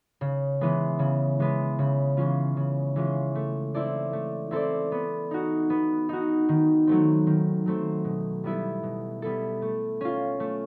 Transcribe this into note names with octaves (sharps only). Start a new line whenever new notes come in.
C#3
E3 G#3 B3
C#3
E3 G#3 B3
C#3
E3 G#3 C#4 F4
C#3
E3 G#3 C#4 F4
A3
C4 E4 A4 D5
A3
C4 E4 A4 D5
B3
D#4 F#4
B3
D#4 F#4
D#3
F#3 A3 C4
D#3
F#3 A3 C4
B2
G3 B3 E4 A4
B2
G3 B3 E4 A4
A3
C#4 F4
A3